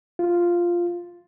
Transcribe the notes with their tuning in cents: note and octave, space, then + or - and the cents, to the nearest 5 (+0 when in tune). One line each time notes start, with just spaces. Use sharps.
F4 -5